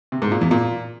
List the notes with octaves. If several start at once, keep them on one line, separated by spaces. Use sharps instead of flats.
C3
G#2
A#2
E2
A#2